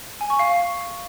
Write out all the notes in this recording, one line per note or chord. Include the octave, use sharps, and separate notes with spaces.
G#5
C#6
F5